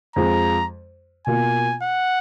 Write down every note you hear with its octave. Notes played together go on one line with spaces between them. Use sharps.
F2 F3 G#3 A#5
B2 A#3 F4 G#5
F#5